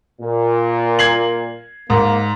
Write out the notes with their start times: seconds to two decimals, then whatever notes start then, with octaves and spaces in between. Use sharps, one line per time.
0.21 A#2
0.99 G#6 C7 F#7
1.90 G#2 A#3